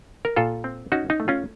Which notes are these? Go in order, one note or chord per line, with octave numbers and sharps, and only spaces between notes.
A#4
A#2 F4 A4
C4
C#4 D#4 F#4
D#4
A3
C#4 F4